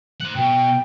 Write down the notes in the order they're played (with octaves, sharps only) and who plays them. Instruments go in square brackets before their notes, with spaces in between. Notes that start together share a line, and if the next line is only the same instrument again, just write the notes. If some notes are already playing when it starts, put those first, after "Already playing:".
[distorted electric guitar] C5 F#5
[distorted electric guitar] B2 [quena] G5